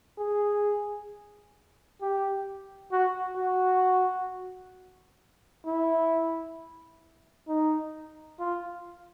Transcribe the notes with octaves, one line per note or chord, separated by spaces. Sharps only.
G#4
G4
F#4
F#4
E4
D#4
F4